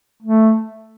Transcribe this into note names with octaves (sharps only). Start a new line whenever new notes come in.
A3